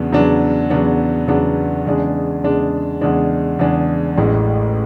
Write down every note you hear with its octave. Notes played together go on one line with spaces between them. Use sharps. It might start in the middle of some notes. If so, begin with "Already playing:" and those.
Already playing: E2 C#3 F#3 B3 D4
E2 C#3 F#3 B3 D4
E2 C#3 F#3 B3 D4
E2 C#3 F#3 B3 D4
E2 C#3 G#3 D4 G#4
E2 C#3 G#3 D4 G#4
E2 C#3 G#3 D4 G#4
E2 C#3 G#3 D4 G#4
A1 A2 G#3